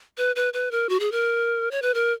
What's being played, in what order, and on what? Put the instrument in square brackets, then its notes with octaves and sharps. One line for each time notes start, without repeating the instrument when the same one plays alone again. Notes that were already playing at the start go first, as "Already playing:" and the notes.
[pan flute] B4
B4
B4
A#4
F#4
G#4
A#4
C#5
B4
A#4